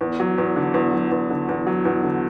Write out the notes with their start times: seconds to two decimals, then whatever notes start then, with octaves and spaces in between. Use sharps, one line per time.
0.01 E2
0.20 F#3
0.38 E2
0.56 D3
0.74 E2
0.93 F#3
1.11 E2
1.30 D3
1.49 E2
1.67 F#3
1.85 E2
2.03 D3